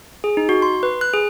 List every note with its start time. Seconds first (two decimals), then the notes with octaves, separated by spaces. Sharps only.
0.24 G#4
0.37 D#4
0.49 F#4
0.62 C6
0.83 B4
1.01 F#6
1.14 G#4